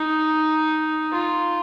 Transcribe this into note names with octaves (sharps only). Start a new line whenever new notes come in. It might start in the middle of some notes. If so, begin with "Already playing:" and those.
Already playing: D#4
F4